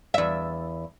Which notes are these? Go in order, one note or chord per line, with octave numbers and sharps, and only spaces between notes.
E2 E5